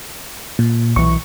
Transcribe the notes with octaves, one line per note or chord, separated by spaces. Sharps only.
A#2
B1 E3 C#6